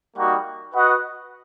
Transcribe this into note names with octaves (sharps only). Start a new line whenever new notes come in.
G3 A#3 D#4 F#4
F#4 B4 D#5 F#5